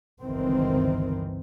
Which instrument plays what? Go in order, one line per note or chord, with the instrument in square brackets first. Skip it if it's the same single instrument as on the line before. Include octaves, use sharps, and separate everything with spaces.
[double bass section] G1 C#2 D#3 E3 C4